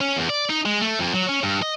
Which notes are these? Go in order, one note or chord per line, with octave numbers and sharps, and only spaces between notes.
C#4
E2
D5
D#4
G#3
A3
F2
F#3
C#4
G2
D#5